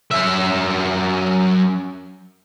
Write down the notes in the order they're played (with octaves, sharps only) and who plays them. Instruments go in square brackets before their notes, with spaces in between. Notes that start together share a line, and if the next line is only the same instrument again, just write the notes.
[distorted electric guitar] F#2 E5